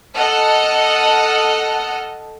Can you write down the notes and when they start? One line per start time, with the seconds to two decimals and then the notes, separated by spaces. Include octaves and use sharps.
0.15 A4 D#5 F#5 F6